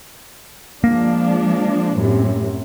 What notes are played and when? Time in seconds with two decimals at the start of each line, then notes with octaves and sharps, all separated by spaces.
0.84 F3 G#3 A#3 D4
1.96 F#2 A2 C3